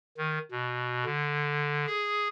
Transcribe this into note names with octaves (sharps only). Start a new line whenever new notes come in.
D#3
B2
D3
G#4